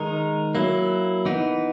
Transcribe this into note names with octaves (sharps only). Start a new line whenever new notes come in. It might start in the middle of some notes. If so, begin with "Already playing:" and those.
Already playing: D#3 G#3 D#4 A#4
F#3 A#3 E4
E3 B3 D#4